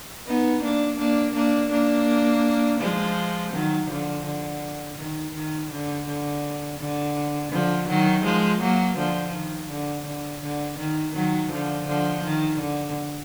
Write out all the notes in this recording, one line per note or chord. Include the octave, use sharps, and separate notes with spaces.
B3 D#4
A#3 D4
A#3 D4
A#3 D4
A#3 D4
F3 G#3
D#3 F#3
D3 F3
D3
D#3
D#3
D3
D3
D3
D3 F3
D#3 F#3
F3 G#3
F#3 A#3
D3 F3
D#3
D3
D3
D3
D#3
D#3 F#3
D3 F3
D3 F3
D#3
D3